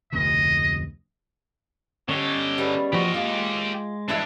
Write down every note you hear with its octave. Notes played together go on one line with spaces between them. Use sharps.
F1 D2 B2 D#5
D3 C#4 G4 C#5 D#5
G3 B3 G#4
F3 F#4 G4 D#5
G#3 F4 D6
E3 G#3 D4 G4 E5